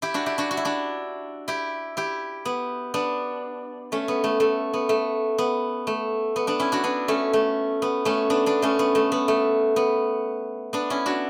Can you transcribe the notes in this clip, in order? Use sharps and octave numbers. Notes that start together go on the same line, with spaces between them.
E4 G4
D4 F#4
E4 G4
D4 F#4
F#4
E4
D4 F#4
E4 G4
E4 G4
B3
B3 D4
A3 C#4
B3
A3
A3
B3
A3
B3
A3
B3
B3 D4
C#4 E4
D4 F#4
B3 D4
A3 C#4
A3
B3
A3 C#4
B3 D4
B3 D4
A3 C#4
B3
A3
B3
A3
B3
B3 D4
C#4 E4
D4 F#4